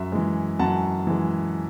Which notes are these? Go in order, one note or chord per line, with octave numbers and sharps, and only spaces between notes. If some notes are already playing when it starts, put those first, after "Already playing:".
Already playing: F#2 E5
E3 G#3
F#2 F#5 A5
E3 G#3